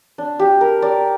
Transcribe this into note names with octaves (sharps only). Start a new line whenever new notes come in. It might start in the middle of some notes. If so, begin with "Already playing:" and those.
D4
G4
A#4
D5